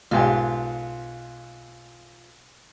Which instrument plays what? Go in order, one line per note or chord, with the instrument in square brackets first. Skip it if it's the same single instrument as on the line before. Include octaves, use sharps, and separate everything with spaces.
[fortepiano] B1 G#2 G4 [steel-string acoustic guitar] F4